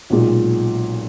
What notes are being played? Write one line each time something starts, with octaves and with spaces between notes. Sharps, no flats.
B1 A#2 G#3